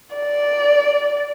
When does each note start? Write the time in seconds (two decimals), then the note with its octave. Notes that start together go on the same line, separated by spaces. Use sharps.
0.16 D5